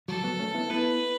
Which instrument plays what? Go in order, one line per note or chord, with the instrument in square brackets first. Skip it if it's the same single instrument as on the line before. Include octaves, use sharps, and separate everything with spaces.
[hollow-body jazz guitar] F#3 [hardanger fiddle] A4
[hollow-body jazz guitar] F#3 B3
A3 C#4
B3 E4
[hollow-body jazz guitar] B3 E4 [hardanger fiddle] B4